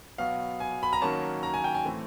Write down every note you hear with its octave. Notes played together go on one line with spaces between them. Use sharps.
B2 F#3 B3 F5
G#5
B5
A#5
D#3 F#3 A#3 C#4 A5
A#5
G#5
G5
G#5
A2 E3 A3 C4